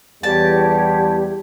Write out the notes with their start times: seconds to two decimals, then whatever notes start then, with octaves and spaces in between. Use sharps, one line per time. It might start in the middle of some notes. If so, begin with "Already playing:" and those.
0.23 E2 G3 G4 C#5 A5